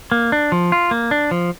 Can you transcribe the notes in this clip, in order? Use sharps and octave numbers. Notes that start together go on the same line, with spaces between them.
A#3
D4
F3
F4
A#3
D4
F3